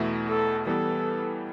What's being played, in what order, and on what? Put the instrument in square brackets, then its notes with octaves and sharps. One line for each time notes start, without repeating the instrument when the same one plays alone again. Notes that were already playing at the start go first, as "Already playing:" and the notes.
Already playing: [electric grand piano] E2 B2 A3 E4
[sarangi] A4
[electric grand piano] E3 G3 B3 [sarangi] A4